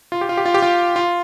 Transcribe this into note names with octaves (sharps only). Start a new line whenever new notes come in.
F4
G4
F4
G4
F4
G4
F4
F4